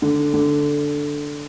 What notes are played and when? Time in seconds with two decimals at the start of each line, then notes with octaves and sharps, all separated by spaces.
0.02 D3
0.34 D3